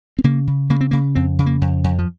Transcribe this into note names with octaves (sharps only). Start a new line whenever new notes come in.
C4
C#3 A#3
C#3
C#3 A#3
C4
C#3 A#3
F2 C4
C#3
A#3
F2
F2
F3